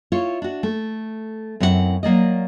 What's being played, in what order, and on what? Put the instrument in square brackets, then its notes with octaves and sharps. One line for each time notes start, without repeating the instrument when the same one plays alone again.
[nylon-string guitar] E4 F4 C#5
D4 F#4
A3
F#2 C4 E4 F#4 F#5
F#3 A#3 D5 D#5